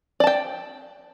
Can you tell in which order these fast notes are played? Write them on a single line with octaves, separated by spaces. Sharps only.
D5 A5 G5